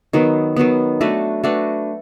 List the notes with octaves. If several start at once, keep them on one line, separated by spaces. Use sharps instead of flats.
D#3 F#3 B3
D#3 F#3 B3
A3 D4 F#4 B4
A3 D4 F#4 B4